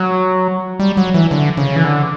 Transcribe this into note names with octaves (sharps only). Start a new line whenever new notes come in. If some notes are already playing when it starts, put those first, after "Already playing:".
Already playing: F#3
G3
F#3
E3
D3
C#3
E3
D3